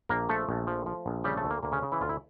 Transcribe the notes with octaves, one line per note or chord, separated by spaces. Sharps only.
A#1 A#3 A#4
F3 A3 A4
A#1
F3
F3
A#1
C#3 G3 G4
A3 A4
D2
A#3
D2 A#3
C#3 C#4
C#3
E3 E4
D2 F4
E4